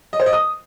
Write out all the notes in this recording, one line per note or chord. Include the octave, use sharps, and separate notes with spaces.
D#5
C5
D#5
D#6